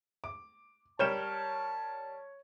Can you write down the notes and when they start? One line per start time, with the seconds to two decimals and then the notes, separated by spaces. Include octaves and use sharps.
0.24 D6
0.99 G3 A#4 C#5 A5 G6 E7